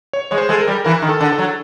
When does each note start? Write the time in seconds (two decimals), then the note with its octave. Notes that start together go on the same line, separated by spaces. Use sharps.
0.13 C#5
0.31 G#3 C#5
0.38 C5
0.49 G#3 A4
0.61 A#4
0.68 G3
0.84 E3 A#4
1.02 D#3
1.09 A4
1.21 D3
1.33 A4
1.38 F#3